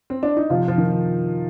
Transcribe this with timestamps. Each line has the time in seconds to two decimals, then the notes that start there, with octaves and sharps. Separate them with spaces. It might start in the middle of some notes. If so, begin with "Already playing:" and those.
0.10 C4
0.23 D4
0.37 D#4
0.50 C3 F3 F4
0.68 F3 F4
0.78 D#3